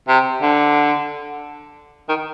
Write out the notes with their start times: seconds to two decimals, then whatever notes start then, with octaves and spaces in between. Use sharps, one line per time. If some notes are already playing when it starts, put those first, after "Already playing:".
0.08 C3
0.42 D3
2.09 D#3